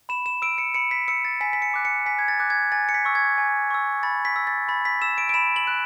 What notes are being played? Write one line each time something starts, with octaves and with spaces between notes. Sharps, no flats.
B5 E7
E7
E6 D7
C#7
B5 C#7
B6
E6 C#7
A6
G#5 B6
B6
C#7
D6 F#6
C#7
G#5 B6
G#6
A6
D6 F#6
G#6
G#5 A6
C#7
B6
C#6 E6
G#6
G#5
C#6 E6
B5 A6
B6
E6
A6
B5 A6
B6
E6 E7
D7
D7
B5 E7
F#7
F#6